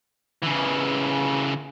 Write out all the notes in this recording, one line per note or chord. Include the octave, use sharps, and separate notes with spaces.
C#3 E3